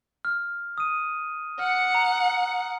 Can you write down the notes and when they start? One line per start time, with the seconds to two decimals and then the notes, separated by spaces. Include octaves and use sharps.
0.25 F6
0.78 D#6 D#7
1.59 F#5 F6 C#7
1.95 A#5